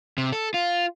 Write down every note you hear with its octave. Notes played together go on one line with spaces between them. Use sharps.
C3
A4
F4